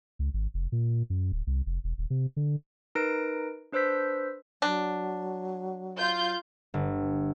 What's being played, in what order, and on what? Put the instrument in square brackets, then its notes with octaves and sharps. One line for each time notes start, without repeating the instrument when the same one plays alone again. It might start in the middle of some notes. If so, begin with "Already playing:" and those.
[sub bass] C#2
G#1
F1
A#2
F#2
D1
C2
F1
E1
D#1
C3
D3
[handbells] D#4 A#4 B4 A#6 D7
D4 B4 C5 E6 G6 B6
[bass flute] F#3 [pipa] D4
[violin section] F4 G6
[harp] G1